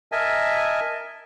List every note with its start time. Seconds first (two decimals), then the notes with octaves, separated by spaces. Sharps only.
0.12 A#4 D#5 E5 G#5 A5